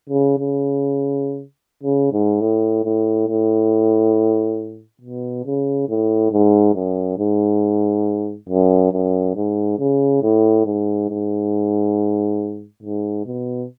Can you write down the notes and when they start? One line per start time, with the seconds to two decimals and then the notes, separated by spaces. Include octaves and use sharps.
0.10 C#3
0.39 C#3
1.83 C#3
2.12 G#2
2.41 A2
2.85 A2
3.28 A2
5.02 B2
5.46 C#3
5.89 A2
6.32 G#2
6.75 F#2
7.18 G#2
8.49 F#2
8.93 F#2
9.36 G#2
9.79 C#3
10.22 A2
10.66 G#2
11.10 G#2
12.83 G#2
13.26 B2